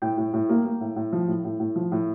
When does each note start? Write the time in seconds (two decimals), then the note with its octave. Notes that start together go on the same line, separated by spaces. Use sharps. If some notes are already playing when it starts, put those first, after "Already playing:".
0.02 A2 G5
0.17 A2
0.33 A2
0.49 A#3
0.65 A#3
0.81 A2
0.96 A2
1.13 F3
1.28 A2
1.44 A2
1.60 A2
1.76 F3
1.92 A2